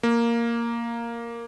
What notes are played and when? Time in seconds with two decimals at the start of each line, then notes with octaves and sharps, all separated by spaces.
0.03 A#3